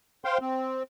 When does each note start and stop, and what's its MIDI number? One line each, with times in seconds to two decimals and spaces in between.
0.25 0.38 72
0.25 0.38 77
0.25 0.38 79
0.25 0.38 84
0.41 0.83 60